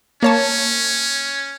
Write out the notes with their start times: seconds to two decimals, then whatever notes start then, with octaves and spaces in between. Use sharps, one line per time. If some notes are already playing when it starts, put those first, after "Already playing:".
0.23 A#3 C#4 C#5 A5